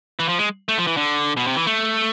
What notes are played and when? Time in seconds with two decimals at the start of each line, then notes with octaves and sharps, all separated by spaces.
0.19 E3
0.29 F3
0.39 G#3
0.69 A3
0.78 F3
0.87 E3
0.97 D3
1.37 B2
1.47 C3
1.56 E3
1.67 A3